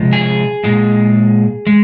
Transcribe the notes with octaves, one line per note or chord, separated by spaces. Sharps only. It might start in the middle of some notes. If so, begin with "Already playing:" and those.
Already playing: C3 F3 G#3
G#4
A#2 G#3
G#3